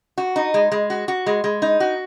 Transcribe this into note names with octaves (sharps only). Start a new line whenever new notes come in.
F#4
D#4
G#3
G#3
F#4
F#4
G#3
G#3
D#4
F#4